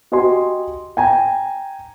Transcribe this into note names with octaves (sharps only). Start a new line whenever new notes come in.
F#4 G4 D#5 G#5 C6
G5 G#5 A#5